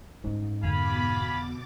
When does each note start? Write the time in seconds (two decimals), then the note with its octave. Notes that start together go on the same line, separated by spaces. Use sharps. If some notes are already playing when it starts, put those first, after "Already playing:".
0.24 G#2 C#4
0.63 F2 B2 D3 F5 G#5 B5 D6 A6